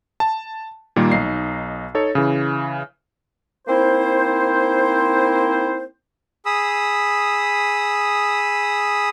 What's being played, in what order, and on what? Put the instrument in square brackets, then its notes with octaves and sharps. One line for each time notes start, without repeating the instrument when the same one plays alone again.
[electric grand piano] A5
A#2 D#3 G3 A#3
B1 D#4 C7
D#4 A4 C#5
C#3 E3
[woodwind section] A#3 C4 D#4 E4 C5
[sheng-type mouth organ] G#4 B5 D#6 E6